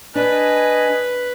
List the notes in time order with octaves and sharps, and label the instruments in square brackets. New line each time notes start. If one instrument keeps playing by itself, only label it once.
[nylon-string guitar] D4 [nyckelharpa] B4 [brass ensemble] D#5 G#5